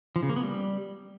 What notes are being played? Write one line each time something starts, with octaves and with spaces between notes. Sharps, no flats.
F3
C#3
A#3
B3
G3